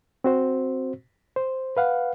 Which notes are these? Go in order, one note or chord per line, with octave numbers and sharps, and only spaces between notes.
C4 F#4 C5
C5
B4 F5 F#5